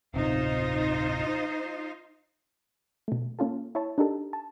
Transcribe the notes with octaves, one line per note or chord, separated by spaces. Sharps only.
D1 G1 C3 D#4 F4 C5
B2 A3
A#3 C#4 F4 A4
E4 C#5 A5
D4 D#4 G4 A4 A#4
A5